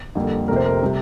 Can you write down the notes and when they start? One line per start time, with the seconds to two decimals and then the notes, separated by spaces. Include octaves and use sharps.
0.15 F2 D3 G3 A#3
0.48 F1 F2 C3 A#4
0.56 C5
0.66 A#4
0.83 C3 G3